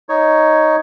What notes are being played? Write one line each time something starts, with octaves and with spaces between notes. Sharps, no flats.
D#4 C#5